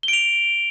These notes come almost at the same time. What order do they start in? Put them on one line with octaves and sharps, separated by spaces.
G7 D7 F7